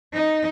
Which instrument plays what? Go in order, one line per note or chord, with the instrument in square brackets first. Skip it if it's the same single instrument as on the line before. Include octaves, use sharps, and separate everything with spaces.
[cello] D#4